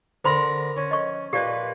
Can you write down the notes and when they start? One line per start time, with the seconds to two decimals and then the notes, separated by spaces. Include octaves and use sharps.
0.25 D3 A#4 C5 B5 C6
0.77 C#4
0.91 D#5 C#6
1.33 A#2 G4 B4 D5